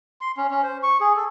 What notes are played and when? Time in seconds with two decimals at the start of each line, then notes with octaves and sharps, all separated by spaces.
0.21 C6
0.37 C#4
0.50 C#4
0.63 C5
0.83 C#6
1.00 G#4
1.16 A4